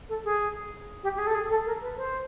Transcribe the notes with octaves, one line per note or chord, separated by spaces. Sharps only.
A4
G#4
G4
G4
G#4
A4
G#4
A4
A#4
B4
C5